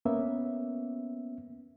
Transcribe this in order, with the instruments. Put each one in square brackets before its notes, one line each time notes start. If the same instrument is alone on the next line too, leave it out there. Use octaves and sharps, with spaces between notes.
[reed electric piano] A#3 B3 C#4 E5